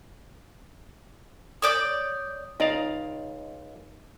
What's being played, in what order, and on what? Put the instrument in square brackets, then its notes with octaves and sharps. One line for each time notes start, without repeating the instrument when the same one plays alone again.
[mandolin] C#5 D5 D6 [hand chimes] D#6 G6
[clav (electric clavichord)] C#2 D5 F5 [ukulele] D#4 D#5